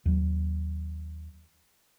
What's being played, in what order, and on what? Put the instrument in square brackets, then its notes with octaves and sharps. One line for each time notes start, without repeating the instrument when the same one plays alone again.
[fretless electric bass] D#2 F#3